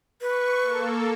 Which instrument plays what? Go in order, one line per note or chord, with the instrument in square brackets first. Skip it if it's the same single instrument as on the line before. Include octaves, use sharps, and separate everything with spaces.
[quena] B4 [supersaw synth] C#6
[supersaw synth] A#3 A4